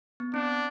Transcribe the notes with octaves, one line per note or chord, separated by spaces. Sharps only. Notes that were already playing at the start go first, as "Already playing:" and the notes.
B3
C4 D4